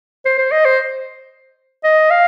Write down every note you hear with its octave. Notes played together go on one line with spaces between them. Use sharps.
C5
C5
D#5
C5
D#5
F5